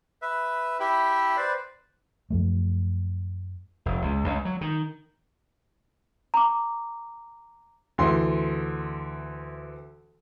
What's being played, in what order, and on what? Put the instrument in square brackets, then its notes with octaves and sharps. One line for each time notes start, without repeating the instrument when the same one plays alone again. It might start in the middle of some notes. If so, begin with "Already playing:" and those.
[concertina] B4 E5
E4 G4 E5 G5 B5
B4 C5 D5
[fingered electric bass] F#2 F3 A3
[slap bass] F1
C#2
C#2
F#3
D#3
[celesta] A#5 D6
[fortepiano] D2 E3 C6